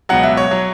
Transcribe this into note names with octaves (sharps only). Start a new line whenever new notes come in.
C#2 B2 F#3 F#5
E5
C#5
F#3